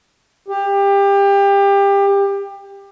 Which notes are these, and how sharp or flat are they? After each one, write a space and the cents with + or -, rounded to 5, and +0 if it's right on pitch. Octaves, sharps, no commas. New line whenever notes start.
G4 +25